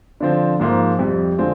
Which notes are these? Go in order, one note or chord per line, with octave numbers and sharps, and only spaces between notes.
D3 F3 C4
G#2 F3 A#3
F2 C3 G3
D3 G#3 C4 F4